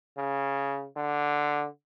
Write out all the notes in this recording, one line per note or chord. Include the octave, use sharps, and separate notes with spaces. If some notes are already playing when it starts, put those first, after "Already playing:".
C#3
D3